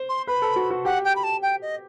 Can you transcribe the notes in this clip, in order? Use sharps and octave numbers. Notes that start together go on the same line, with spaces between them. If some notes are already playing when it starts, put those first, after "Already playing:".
Already playing: C5
C6
B4 B5
A4
F#4
F#4
G4 F#5
G5
B5
A5
G5
D#5